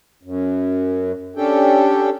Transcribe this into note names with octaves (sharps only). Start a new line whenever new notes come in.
F#2
C#4 D4 G4 A4 G5